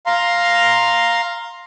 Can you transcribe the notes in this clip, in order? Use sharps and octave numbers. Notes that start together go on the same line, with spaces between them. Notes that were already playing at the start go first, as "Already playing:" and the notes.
F5 A#5 C6